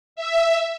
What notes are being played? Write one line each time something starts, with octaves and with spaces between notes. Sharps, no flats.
E5